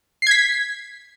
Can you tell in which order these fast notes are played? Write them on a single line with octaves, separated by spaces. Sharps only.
C7 G#6 B6